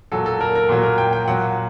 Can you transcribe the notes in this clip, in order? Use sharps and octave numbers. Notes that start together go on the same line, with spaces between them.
A#2 F#3 A4
A4
A#4
A#4
A#2 F#3
A#4
G5
G5
A#2 F#3 F#5